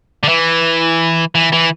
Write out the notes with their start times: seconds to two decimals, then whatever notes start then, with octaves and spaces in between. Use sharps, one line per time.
0.24 D3
0.29 E3
1.35 E3
1.52 E3